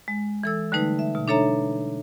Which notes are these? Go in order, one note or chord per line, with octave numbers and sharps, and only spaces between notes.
G#3
E3 A4 E6
D3 G3 A3 D#4 B4
E5
B2
D4 D#4 A4 C#5 E5 A#5